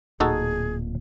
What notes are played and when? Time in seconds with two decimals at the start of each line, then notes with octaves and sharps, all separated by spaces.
0.20 D1 A#2 D#4 F#4 G#4 A4